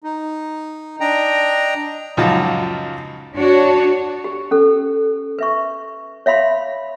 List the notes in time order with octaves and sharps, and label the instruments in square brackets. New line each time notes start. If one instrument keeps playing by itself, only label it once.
[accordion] D#4
D4 D#5 G5 A#5
[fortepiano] C#2 F#2 F3 D#4 A5
[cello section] D4 F#4 C#5
[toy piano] G4
C#4 A4
B4 E5 C#6
C#5 E5 F5 B5 C6